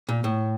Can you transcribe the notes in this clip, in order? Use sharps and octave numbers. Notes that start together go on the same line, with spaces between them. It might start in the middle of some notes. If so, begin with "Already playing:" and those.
A#2
A2